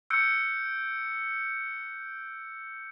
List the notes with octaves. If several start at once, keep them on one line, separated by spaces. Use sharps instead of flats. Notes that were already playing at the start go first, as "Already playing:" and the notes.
E6 F#6 G6 C#7 D7